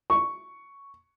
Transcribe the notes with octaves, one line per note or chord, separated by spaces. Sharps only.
C#6